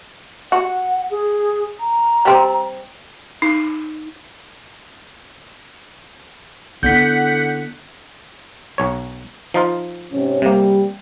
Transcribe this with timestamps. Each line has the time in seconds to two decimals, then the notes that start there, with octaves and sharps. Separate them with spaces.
0.52 F#4 F#5
1.10 G#4
1.80 A#5
2.25 G3 C4
3.42 D#4
6.83 D3 B3 E4 F#5 G6 B6 C#7
8.78 B1 C#5
9.54 F3 D#4 F4
10.11 G#2 C3 C#4
10.42 C3 G3 A#3